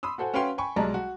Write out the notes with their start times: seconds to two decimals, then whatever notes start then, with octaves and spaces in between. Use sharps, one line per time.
0.03 B5 C6 D#6 E6
0.18 F#4 A4 C5 F#5 G#5
0.34 C#4 F#4 B4 F5 G5 C6
0.58 G5 G#5 B5 C#6
0.76 B1 G3 G#3 D5 A5 A#5
0.94 F#4